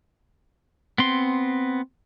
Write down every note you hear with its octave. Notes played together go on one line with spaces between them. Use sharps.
B3 C4 C6